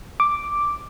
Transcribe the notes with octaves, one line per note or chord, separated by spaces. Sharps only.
D6